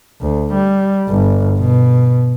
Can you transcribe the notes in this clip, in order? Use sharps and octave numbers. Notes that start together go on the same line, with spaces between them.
D2
G3
G1
B2